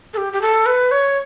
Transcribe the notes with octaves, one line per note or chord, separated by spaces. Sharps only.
A4
G4
G4
A4
B4
C#5